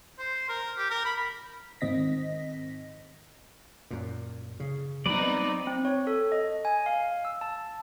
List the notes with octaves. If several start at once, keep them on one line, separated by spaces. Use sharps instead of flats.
C5
A#4
G4
A#4
B5
G#2 D#3 C4 D#5 A#6 B6
F#2 A#2
C#3
F#3 G3 B3 C4 D#4 B4 D5
C4
C#5
A4
D#5
G#5
F5
E6
A5